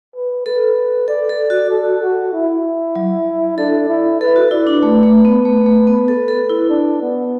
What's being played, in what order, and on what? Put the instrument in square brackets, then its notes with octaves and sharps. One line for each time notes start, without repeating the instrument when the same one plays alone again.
[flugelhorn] B4
[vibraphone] A4 [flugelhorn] B4
[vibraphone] A4 [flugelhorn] D5
[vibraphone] A4
F#4
[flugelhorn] A4
F#4
E4
[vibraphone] F#3
[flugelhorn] D4 [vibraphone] A4
[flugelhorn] E4
[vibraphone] A4 [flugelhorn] B4
[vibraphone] F#4
[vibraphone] E4 [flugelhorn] D5
[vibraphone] D4
[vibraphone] A3 [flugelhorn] B4
[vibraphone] A3
B3
A3
A3
B3
A4
A4
E4
[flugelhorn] D4
B3